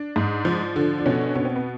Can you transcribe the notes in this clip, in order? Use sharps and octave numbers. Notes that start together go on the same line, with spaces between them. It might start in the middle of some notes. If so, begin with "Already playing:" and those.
Already playing: D4
G#2
F3
D3
D4
B2 C#4
B2 C#4
C4
B3